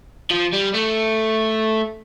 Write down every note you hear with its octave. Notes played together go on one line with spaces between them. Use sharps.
F3
G3
A3